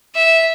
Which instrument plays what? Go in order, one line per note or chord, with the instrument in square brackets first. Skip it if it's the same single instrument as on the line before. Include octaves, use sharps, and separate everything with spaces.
[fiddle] E5